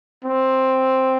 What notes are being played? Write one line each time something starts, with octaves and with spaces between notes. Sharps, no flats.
C4